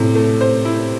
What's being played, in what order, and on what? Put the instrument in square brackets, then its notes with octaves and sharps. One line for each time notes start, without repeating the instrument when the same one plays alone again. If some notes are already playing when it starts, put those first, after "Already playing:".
Already playing: [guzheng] A2 [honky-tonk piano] C3
[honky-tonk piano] A3
C5
E4